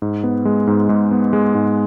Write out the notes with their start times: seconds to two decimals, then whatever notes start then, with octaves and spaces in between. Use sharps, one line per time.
0.02 G#2
0.24 B3
0.45 G#3
0.67 G#2
0.89 G#2
1.11 B3
1.33 G#3
1.55 G#2